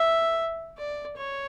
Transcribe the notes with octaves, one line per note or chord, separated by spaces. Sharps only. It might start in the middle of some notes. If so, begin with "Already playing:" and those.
Already playing: E5
D5
C#5